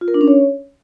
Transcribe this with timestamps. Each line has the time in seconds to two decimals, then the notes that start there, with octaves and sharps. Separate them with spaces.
0.01 F4
0.08 A#4
0.14 D4
0.21 C#4
0.28 C#5